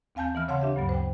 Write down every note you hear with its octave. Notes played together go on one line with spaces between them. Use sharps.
D#2 C4 F5 G#5 A5 G6
E3 B3 F6
C#3 C#5 F5 F#5 A5 C6
D4 G4 E5
D2 G2 F#3 B3
C5 G5